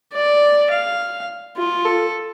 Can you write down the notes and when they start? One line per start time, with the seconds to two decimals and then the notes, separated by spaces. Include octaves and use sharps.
0.13 D5
0.71 F5
1.57 F4
1.85 A4